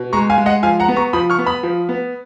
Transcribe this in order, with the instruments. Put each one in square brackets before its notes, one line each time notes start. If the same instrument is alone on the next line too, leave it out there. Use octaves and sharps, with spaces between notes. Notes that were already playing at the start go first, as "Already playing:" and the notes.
Already playing: [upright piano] B2
G#3 A#5 C#6
F5 G#5
G#3
D#5 F#5
F3 F5 G#5
F#5 A#5
B3
A#5 C#6
F3 B5 D#6
C#6 F6
B3
B5 D#6
F3
B3